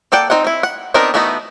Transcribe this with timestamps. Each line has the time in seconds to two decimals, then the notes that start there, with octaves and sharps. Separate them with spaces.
0.12 A#3 A4 D5 F#5 G5
0.30 C4 D#4 C5 F#5
0.44 C4 E4
0.63 F#5
0.94 B3 C4 D4 D#4 A#4
1.14 E3 A3 B3 D#4 F#4